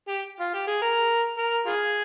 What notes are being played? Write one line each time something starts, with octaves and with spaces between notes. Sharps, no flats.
G4
F4
G4
G#4
A#4
A#4
F4 G#4